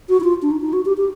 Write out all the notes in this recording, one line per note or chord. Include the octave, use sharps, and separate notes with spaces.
F#4
E4
F4
D4
D#4
D#4
F#4
G4
G4